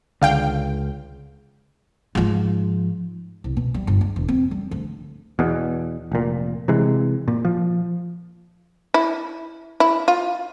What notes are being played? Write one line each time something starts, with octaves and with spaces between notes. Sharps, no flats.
C#2 D3 F5 G5
G#2 F3
C2
B2
G3
G1
G#3
E1
C4
G3
D2
E2 B2
F1 A#2
C3 E3 G#3
A#2
F3
E4
E4
F4